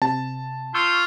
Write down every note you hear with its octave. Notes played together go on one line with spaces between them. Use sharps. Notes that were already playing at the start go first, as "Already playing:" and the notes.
C3 A5
F4 C#6 E6 G6